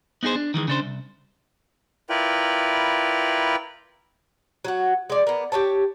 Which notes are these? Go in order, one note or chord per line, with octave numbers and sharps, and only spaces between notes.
B3 D#4 F#4 G#4 C5
D4
D#3 E3 F#3 G#3
C#3 D4 C5
C2
E4 F4 A#4 B4 D5 G5
F#3 F#4
G#3 D5
A#3 B3
G4 A4 C#5 A5